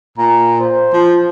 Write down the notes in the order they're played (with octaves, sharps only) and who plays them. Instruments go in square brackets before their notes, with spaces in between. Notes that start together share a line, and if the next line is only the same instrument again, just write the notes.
[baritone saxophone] A#2 [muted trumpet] A#5
[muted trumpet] C5
[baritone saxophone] F3